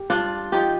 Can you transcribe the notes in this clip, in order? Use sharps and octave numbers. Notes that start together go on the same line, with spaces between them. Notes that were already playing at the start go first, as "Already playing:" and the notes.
Already playing: G4
G2 D4 F4
F3 D#4 G4